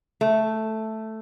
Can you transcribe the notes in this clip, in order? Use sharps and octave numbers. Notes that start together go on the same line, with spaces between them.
A3